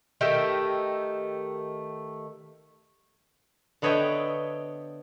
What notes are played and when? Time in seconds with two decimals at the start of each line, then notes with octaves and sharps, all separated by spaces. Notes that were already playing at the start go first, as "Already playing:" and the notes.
0.21 D#3 A3 G4 E5
3.82 D3 B3 C#5 D#5 E5 G5